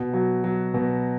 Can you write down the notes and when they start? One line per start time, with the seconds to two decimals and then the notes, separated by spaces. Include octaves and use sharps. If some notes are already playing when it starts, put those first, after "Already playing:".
Already playing: B2
0.13 F#3
0.44 F#3
0.74 B2